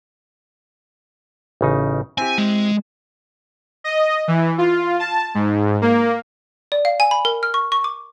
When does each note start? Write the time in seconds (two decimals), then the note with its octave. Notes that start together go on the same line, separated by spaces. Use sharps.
1.61 A1 C#3 D#4
2.18 C4 E4 G4 G#5
2.38 G#3
3.84 D#5
4.28 E3
4.58 F4
4.99 A5
5.35 G#2
5.82 A#3
6.72 D5
6.85 F5
7.00 G#5
7.11 B5
7.25 A#4
7.43 F6
7.54 C#6
7.72 C#6
7.84 D6